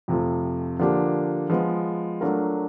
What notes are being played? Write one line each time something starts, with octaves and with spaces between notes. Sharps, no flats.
F2 C3 F3 A3
D3 F3 A#3 D4 G4
F3 G#3 B3
F#3 A3 D4 F4 A#4